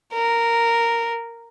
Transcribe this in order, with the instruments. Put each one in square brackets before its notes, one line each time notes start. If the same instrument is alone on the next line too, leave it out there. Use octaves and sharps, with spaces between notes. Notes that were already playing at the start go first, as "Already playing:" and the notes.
[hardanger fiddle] A#4